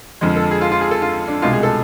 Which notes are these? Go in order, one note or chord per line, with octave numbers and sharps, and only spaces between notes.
F2 D3 F3 G#3
A4
G#4
F4
F4
G#4
A4
F4
D4
C2 B2 G#3 F4
G#4
A4